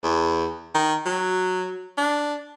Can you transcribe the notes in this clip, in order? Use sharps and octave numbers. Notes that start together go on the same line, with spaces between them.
E2
D#3
F#3
D4